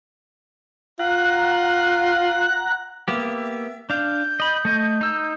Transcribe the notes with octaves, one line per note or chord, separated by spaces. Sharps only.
F4 F#5 A#5 F#6
A#3 B3 G4 E5
D4 F5 G6
D#5 B5
A3 D#5
D#4 E6